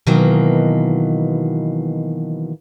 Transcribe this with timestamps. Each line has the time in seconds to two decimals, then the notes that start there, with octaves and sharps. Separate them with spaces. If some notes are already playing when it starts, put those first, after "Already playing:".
0.07 B2 D#3 E3 F#3 A#3